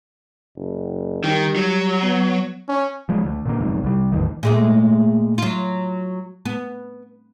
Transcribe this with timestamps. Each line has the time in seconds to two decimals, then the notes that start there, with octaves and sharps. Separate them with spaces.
0.56 F#1
1.24 D#3 G3
1.56 F#3
2.03 B3
2.69 C#4
3.09 F3 G#3
3.24 D2
3.46 A#2 D3 A#3
3.61 F#1 B1 F2 G#2
3.84 C2 G3
4.12 A1 E2 D#3
4.43 A#2 G#3 A3
5.38 F#3 F4
6.45 B3